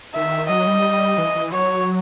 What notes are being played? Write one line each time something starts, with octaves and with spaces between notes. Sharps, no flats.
D#3 E5
F#3 D#5
G3
E3
E3
F#3 C#5